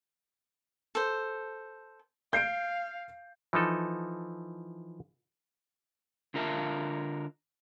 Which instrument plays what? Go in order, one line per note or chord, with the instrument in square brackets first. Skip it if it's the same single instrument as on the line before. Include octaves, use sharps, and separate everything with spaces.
[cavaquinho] A4 C5
[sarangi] F5 [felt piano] G6 C7 D7
[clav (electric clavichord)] E3 F3 D#4 A4
[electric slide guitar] D3 F4 A#4 E5 F5 A5